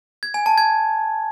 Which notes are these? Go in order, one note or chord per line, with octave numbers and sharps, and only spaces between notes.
G#6
G#5
A5
G#6